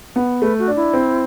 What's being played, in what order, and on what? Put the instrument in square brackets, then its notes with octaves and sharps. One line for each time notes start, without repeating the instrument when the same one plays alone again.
[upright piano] B3
[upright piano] A3 [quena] B4
[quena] F#4
[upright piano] D4
[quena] E4
[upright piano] C4